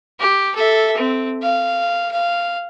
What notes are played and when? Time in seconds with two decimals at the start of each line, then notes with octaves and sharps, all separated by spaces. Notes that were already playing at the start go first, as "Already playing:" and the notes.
0.20 G4
0.55 A4 E5
0.97 C4
1.43 F5
2.11 F5